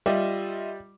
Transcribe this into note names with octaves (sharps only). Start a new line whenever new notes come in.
G3 F4 D#5 E5